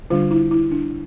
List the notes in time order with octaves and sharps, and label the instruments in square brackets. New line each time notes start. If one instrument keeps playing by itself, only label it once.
[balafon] D3 G3 D4 F4
E4
E4
D4